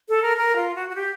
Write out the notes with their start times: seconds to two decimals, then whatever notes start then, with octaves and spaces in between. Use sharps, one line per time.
0.09 A4
0.22 A#4
0.37 A#4
0.56 F4
0.75 F#4
0.89 F#4
0.95 G4